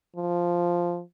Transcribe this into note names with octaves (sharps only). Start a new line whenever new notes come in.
F3